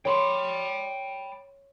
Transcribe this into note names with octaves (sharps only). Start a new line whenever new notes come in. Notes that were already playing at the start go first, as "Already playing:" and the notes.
C#5 G5 B5 C6